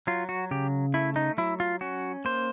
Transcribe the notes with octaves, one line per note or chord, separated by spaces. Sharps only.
F#3 F4
F#4
C#3 G4
A3 E4
D#4
F#3 E4
F4
C#4 F#4
A#3 C5